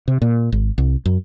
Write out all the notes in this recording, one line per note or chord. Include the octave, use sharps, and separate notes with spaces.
C3
A#2
G#1
C2
F#2